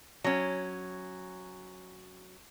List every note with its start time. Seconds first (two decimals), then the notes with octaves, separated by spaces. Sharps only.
0.24 F#3 C#4